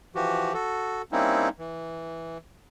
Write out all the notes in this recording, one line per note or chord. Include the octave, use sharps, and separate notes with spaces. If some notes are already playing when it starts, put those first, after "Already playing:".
E3 F3 F#4 G4
F#4 A4
G3 A#3 C4 C#4 D#4 E4
E3